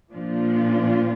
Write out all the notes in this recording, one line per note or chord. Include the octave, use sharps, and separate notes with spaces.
A#2 F3 A#3 D4 F4